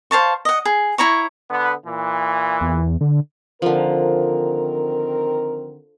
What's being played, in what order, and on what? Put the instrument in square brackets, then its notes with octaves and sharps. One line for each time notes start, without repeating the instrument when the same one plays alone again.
[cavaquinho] C5 F5 A5 C#6
D#5 F#5
G#4
E4 C#5 A#5 C#6
[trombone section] D3 B3
A#2 E3
[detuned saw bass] E2
D3
[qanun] D3 F3 [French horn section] D#3 C4 A#4